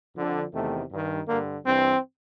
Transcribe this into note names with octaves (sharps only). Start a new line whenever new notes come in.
F2 D3
E2 C3 D#3 A3
G2 D#3
G2 D3 A#3
G2 E3 C4